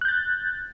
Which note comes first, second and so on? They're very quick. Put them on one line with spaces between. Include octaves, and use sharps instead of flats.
F#6 G6 A6